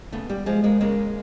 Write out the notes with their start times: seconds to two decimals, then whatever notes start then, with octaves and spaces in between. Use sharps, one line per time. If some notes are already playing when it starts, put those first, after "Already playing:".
0.12 C#3 A3 B3
0.29 G3
0.46 F3 G#3
0.64 G#3 A#3
0.80 C#3 G#3 A#3